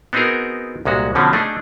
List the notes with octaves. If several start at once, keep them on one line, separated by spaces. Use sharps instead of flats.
B3 C4 D#4 F#4 G#4 A#4
C2 A#2 G#3 F#4
B2 D3 F3 C4 C#4
A3 D4 D#4 G#4